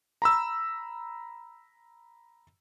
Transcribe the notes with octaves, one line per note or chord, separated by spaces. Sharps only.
A#5 B5 E6